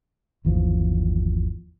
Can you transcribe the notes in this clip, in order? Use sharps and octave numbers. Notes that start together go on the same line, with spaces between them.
G1 D#2 E3 F3